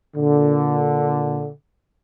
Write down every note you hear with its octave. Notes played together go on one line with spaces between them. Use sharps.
A#2 D3